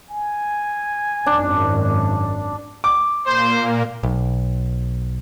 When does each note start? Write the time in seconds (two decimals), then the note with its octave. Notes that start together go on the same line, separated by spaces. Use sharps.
0.10 G#5
1.26 G#1 F#2 D4
2.84 D6
3.26 A#2 A#3 C5
4.03 B1